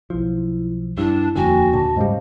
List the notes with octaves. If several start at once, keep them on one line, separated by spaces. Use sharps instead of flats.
B1 F3 E4
G2 D4 E4
D#1 F2 D3 A#3 F#4 G5 G#5
D#2 A#2 D3 A5
G#2 C#3 G3 C5 D#5 F5